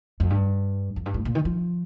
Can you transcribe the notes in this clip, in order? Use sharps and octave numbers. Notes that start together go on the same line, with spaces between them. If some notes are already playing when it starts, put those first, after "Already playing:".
F2
G2
F2
G2
A2
A#2
D#3
F3